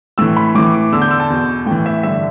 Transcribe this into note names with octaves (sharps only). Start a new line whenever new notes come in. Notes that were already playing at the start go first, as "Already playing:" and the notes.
A2 E3 E6
B5
A2 E3 D6
D6
E2 D3 E6
G6
E6
A5
E2 B2
A2 E3 G5
E5
G2 D3 E5